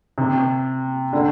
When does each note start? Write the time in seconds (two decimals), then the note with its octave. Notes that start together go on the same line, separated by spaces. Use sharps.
0.18 C3
1.13 D3